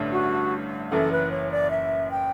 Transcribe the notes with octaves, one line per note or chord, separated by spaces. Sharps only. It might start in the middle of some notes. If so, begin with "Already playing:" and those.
Already playing: A1 G2 D3 A3
F#4
F#1 F#2 E3 A4
B4
C#5
D5
E5
G5